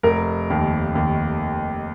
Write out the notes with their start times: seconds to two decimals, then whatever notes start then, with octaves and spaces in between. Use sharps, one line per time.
0.03 F1 A#4
0.50 D#2
0.95 D#2